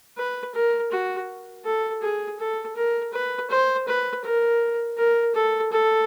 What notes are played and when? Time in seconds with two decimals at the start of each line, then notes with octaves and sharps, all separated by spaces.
0.17 B4
0.55 A#4
0.92 F#4
1.65 A4
2.02 G#4
2.39 A4
2.76 A#4
3.13 B4
3.50 C5
3.88 B4
4.24 A#4
4.98 A#4
5.35 A4
5.72 A4